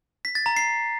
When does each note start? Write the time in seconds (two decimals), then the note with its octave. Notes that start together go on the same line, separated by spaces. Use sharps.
0.25 B6
0.35 A6
0.46 A#5
0.56 C7